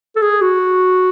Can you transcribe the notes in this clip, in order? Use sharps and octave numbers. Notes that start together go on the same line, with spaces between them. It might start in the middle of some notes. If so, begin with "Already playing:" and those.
A4
G#4
F#4